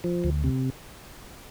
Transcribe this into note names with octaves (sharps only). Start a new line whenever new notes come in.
F3
D2
C3